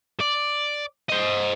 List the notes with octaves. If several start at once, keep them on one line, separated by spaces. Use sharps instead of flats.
D5
C5 D#5